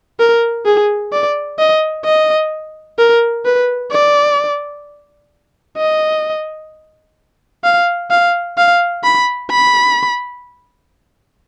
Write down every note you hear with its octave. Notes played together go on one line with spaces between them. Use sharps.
A#4
G#4
D5
D#5
D#5
A#4
B4
D5
D#5
F5
F5
F5
B5
B5